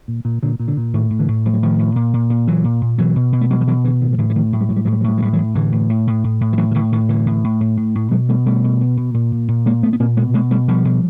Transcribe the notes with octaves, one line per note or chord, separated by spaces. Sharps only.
A#2
A#2
A#2 D3
A#2
D3
A#2
A2 D#3
A2
D3 E3
A2
A2 F3
F#3
A2 D#3 F3
A2
A#2
A#2
A#2
A#2 E3 F#3
A#2
A#2
B2 E3 F#3
B2
B2
A3
B2 F#3 G#3
F3
B2 E3 F#3
B2 D3 E3
A2 D#3
F3
A2 D3 E3
E3
A2 D#3 F3
A2 F#3
G3
A2 F#3
G3
A2 F#3
G3
F#3
A2 G3
F#3
A2 G3
E3 F#3
A2
A2 D3 E3
A2
A2
A2
A2
A2
F3
A2 E3 F#3
D#3
A2 D3 E3
A2 D#3
A2 D3 E3
A2
A2
A2
A2
A2
B2 F#3 G#3
B2 G3 A3
B2 G3 A3
B2
B2
B2
A#2
A#2
A#2
A#2 G#3 A#3
A#2 A3 B3
B3
A#2 A#3 C4
B2 G#3 A#3
B2 G#3 A#3
B2 G3 A3
B2 F3 G3
B2